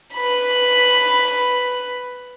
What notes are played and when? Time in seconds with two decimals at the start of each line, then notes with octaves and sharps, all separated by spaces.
0.15 B4 B5